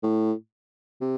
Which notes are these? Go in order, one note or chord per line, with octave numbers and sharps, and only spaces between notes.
A2
C3